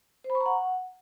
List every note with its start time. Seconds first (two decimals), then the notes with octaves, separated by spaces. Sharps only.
0.24 C5
0.30 B5
0.35 C#6
0.40 A#5
0.46 F#5